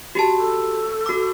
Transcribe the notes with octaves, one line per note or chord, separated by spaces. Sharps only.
F#4 G4 A5
A4
F#4 D6